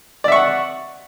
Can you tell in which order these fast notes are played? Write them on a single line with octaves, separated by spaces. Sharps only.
D5 E5 C#6 F#5